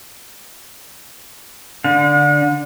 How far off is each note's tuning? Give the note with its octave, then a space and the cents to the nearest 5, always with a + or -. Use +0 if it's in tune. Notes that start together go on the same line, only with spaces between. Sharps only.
D3 +0 F#5 -40